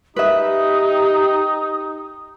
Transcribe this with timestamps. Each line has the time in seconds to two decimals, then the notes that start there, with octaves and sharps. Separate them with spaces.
0.16 D#4 G4 B4 E5 D#6